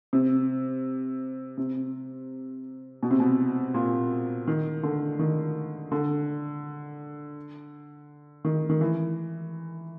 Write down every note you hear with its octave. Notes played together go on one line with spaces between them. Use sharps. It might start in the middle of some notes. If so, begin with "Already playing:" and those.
C3
C3
B2
C3
B2
A#2
D#3
D3
D#3
D3
D#3
D#3
E3